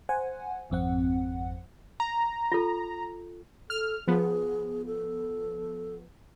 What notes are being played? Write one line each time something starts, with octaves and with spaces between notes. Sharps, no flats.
C5 F#5 G#5
G#1 F2 C4 F#5
A#5
F4 A4
A4 F6
F3 B3 G#4
A4